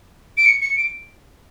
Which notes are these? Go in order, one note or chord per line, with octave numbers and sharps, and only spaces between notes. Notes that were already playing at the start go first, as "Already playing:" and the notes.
D7
C#7
C#7
D7